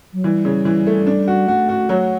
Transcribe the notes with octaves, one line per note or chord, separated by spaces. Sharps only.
F#3
E3 G3
C#3
E3
A3
D4
F#4
A3 F#4
F#4
F#3